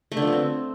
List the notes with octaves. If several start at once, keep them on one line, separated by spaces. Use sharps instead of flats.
A3
D3
F3
B3
C4